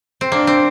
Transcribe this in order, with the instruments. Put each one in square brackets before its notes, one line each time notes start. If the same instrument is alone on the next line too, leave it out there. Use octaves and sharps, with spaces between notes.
[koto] C4
[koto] A#3 [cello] D4
[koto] C4